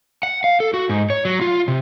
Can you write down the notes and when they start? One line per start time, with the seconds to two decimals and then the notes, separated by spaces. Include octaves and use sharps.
0.23 F#5
0.44 F5
0.60 A4
0.74 F#4
0.89 G#2
1.10 C#5
1.25 F#3
1.41 F4
1.68 C3